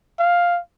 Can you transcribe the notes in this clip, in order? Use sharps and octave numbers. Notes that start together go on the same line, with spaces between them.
F5